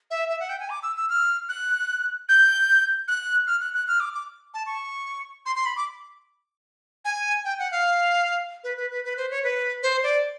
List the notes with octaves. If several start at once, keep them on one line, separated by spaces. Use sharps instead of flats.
E5
E5
F#5
G5
G#5
D6
E6
E6
F6
F#6
G6
F#6
F6
F#6
F#6
F6
D6
D6
A5
C#6
C6
C6
B5
D6
G#5
G5
F#5
F5
B4
B4
B4
B4
C5
C#5
B4
C5
D5